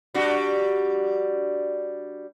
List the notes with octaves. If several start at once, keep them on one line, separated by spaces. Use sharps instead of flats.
G3 D4 F#4